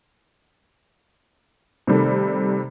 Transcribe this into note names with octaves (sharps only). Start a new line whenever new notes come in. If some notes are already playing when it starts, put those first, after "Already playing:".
C3 D#3 G3 A3